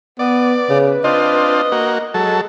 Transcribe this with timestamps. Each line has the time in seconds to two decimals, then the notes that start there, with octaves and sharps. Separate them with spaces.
0.19 B3 B4 D5
0.69 C#3
1.04 C4 D4 F4 D#5
1.72 A#3 F#4
2.14 F#3 G#3 A4